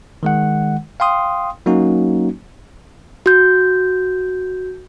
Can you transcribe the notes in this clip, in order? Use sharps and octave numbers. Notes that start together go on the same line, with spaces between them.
D#3 G#3 F#5
F5 G5 C6 D#6
F#3 A#3 C#4 D#4 F#4
F#4 G6